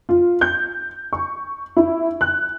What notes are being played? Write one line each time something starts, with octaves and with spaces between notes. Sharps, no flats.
F4
G6
C#6
E4
F#6